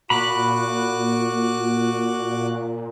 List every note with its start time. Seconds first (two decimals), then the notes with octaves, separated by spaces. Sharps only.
0.10 A#2 F#4 B5 D6 F#6